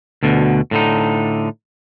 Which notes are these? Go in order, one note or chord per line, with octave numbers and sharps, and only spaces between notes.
D2 B2 D3
A2 D3 D#4